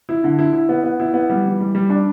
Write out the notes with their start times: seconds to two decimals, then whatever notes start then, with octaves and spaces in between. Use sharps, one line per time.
0.09 E4
0.24 D3
0.39 E4
0.53 E4
0.69 B3
0.84 B3
1.00 E4
1.14 B3
1.30 G3
1.45 E3
1.60 G3
1.75 G3
1.90 D4